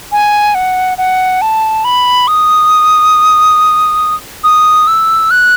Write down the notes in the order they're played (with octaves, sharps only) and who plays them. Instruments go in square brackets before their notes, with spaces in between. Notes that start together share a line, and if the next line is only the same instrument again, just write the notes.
[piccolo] G#5
F#5
F#5
A5
B5
D#6
D#6
E6
F#6